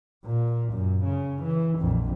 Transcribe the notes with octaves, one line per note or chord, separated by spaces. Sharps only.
A#2
F#2
C#3
E3
A#1 F2